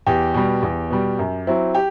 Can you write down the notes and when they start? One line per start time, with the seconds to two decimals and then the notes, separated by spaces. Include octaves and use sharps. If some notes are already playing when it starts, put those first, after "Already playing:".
0.07 E2 G4
0.34 B2 G3
0.63 E2
0.90 B2 G3
1.19 F#2
1.47 F#3 C4 E4
1.75 G4